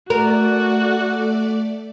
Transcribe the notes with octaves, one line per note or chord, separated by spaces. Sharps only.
A3 F#4 A#4 D5